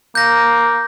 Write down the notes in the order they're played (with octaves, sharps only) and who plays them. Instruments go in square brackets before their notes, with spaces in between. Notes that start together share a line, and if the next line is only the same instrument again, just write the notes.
[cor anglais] A#3 [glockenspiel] G6 A#6